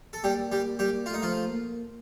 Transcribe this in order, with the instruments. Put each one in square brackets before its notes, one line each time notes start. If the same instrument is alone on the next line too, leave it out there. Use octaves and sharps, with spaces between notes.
[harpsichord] A4
[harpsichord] G3 G4 [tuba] A#3
[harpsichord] G3 G4
G3 G4
[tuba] A3 [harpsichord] F4
[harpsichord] D#4
F3 F4
[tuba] A#3